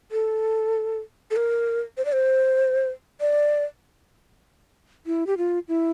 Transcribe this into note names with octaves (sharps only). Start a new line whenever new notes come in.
A4
A4
A#4
C5
D5
C5
D5
E4
G4
F4
E4